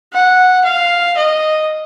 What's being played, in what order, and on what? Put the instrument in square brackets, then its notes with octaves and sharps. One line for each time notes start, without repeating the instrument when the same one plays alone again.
[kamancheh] F#5
F5
D#5